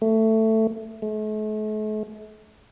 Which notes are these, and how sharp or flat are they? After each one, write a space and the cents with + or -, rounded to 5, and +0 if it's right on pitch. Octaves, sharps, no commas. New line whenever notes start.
A3 +10
A3 -45